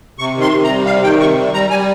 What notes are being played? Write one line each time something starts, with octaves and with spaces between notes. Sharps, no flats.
C3 C#6
D#3
C6
C3
A#5
G3
C3 F5
D#3 G5
C3 C#6
G3
G3 A#5
G3 G#5